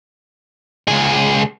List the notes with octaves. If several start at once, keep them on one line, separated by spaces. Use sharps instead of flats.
C#2 G#4